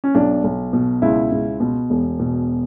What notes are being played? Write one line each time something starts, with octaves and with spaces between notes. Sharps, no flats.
C#4
B1 D4
B1
B2
C#2 E4
C#2
B2
E1
B2